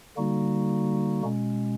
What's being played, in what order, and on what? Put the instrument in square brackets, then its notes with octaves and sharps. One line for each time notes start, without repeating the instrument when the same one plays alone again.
[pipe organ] D3 G3 A#3 D#4 F#4
B2 G#3 C#4